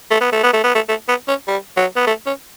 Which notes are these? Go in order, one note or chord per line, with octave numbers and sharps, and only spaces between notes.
A3
B3
A3
B3
A3
B3
A3
A3
B3
C#4
G3
F#3
B3
A3
C#4